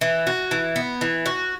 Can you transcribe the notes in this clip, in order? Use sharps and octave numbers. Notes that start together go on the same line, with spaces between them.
E3
F#4
E3
B3
E3
F#4